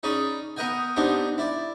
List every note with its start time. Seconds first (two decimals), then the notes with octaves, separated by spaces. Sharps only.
0.03 C#4 D#4 G#4 D5 B5
0.57 B3 A#4 B4 D#5 G5 G#5
0.96 B3 C4 D4 D#4 G4
1.38 E4 D5